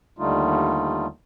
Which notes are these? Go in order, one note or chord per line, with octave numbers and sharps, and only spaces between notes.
D#2 D3 G3 A3 D#4 F4